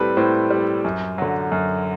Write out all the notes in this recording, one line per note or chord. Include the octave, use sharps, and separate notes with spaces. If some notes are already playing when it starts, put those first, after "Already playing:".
Already playing: A2 G3 C4 A4 B4
A2 C5
G3
F#2
D3 F#3
F#2